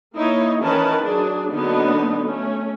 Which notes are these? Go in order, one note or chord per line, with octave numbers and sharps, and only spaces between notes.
A#3 D#4 E4 C#5
D#3 E3 C#4 A#4 B4 A5
F#3 D4 G#4
D3 F#3 A#3 B3 D4 D#4
A3 C#4